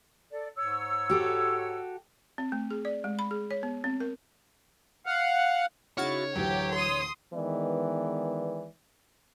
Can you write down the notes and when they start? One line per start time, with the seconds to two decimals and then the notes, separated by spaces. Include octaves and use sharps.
0.32 A4 D5
0.57 G#2 C#5 E6
1.10 F#4 G4 A4
2.38 C4
2.52 A3
2.71 G#4
2.85 D5
3.04 G#3
3.19 B5
3.31 G#4
3.51 C#5
3.63 B3
3.84 C4
4.00 A#4
5.06 F5 F#5
5.98 C#3 D#4 E4 F#4 C#5 F6 A6
6.35 D2 A2 E3 F#3 G4
6.75 C6 D#6
7.34 D#3 E3 G#3 B3 B4 D5